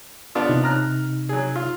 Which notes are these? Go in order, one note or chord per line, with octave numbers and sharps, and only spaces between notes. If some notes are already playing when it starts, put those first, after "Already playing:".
B3 D4 F4
C3 D#4
A#5 F6 F#6
F#3 G#4
F4